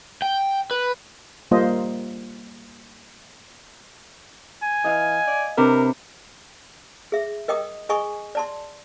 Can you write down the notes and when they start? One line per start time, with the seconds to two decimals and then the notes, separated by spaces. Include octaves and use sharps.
0.22 G5
0.71 B4
1.51 G3 A#3 F4 C5 D#5
4.63 G#5
4.84 E3 D#5 F5 F6
5.27 D5
5.57 C3 D4 A#4 B4
7.12 G#4 E5
7.48 A#4 D#5 G5 D6 D#6
7.89 G#4 D#5 G#5 B5 C#6 D#6
8.35 D5 A5 C6